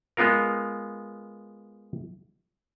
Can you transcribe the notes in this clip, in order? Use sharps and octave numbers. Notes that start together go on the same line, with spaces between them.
G#3 B3 F4 A#4